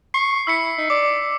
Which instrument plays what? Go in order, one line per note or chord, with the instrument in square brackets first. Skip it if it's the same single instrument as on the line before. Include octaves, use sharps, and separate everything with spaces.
[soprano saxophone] C#6 [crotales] C7
[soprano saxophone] E4 [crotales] E6 B6 C#7
[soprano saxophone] D#4
[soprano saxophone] D5 [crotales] D6